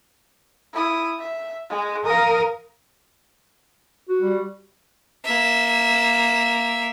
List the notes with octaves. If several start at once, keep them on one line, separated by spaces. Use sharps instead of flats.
E4 D#6
E5
G#3
A#4 F5 D#6
F#4
G3
A#3 E5